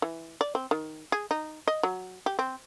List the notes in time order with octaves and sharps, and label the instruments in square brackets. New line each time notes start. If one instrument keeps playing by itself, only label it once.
[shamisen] E3
D5
C4
D#3
G#4
D#4
D#5
F#3
G4
C4